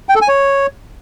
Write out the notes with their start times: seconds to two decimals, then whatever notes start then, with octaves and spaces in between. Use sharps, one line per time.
0.09 G5
0.15 A4
0.22 G#5
0.28 C#5